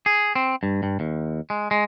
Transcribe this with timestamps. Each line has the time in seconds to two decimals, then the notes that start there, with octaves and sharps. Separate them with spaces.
0.06 G#4
0.36 C4
0.63 G2
0.83 G2
1.00 D#2
1.50 G#3
1.71 G#3